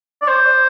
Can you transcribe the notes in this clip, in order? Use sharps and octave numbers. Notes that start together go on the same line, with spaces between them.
D5
C5